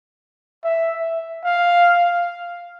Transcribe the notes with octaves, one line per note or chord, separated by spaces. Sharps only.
E5
F5